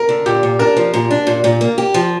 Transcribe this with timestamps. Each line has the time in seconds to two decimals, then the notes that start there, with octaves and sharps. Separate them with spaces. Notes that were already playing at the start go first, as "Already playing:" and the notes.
Already playing: A#4
0.09 D3
0.26 A#2 G4
0.43 A#2
0.59 D4 A#4
0.77 F3
0.94 A#2
1.11 D4
1.27 A#2
1.44 A#2
1.61 A#3
1.78 G4
1.94 F3